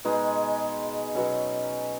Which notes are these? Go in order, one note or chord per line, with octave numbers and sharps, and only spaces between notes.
B2 G#3 D#4 G#4
B2 F#3 C#4